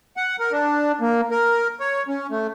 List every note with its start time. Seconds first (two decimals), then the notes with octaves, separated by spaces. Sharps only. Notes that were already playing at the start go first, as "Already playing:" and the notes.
0.17 F#5
0.39 A#4
0.52 D4
1.01 A#3
1.31 A#4
1.80 C#5
2.08 C#4
2.31 A3